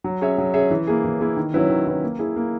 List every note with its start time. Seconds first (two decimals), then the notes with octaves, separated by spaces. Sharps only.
0.04 F#3
0.21 C#4 G#4 C#5 E5
0.38 F#3
0.54 C#4 G#4 C#5 E5
0.71 E3
0.87 A#3 E4 G#4
1.04 E3
1.20 A#3 E4 G#4
1.37 D#3
1.54 F#3 C#4 E4 B4
1.70 D#3
1.87 F#3 C#4 E4 B4
2.03 A#3
2.19 E4 G#4
2.36 A#3